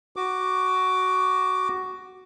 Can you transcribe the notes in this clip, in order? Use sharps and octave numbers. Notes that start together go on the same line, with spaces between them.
F#4 D6